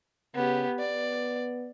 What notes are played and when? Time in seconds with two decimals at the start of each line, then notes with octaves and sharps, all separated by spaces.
0.35 C#3 B3 G4
0.80 B3 D5